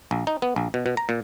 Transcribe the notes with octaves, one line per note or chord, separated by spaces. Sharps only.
A#1
D#4
B3
A#1
B2
B2
A#5
A#2